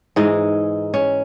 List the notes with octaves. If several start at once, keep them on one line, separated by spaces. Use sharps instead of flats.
G#2 E3 G#3 D#4
C#4